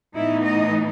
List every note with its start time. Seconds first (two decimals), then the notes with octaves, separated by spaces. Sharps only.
0.16 A2 E3 B3 D#4 E4
0.44 D#5